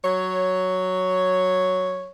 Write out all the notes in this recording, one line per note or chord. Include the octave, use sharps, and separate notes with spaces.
F#3 C#5